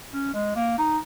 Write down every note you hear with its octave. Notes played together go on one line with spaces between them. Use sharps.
C#4
G#3
A#3
D#4